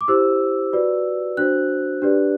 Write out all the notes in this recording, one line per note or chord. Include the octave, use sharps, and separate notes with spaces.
D6
E4 G4 C5 E6
F#4 B4 D5
D4 F#4 C5 F#6
D4 G4 B4 D5